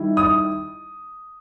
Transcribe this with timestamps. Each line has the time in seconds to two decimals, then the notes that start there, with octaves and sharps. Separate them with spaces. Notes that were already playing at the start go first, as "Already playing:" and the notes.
Already playing: D#3 G3 E4
0.17 D#6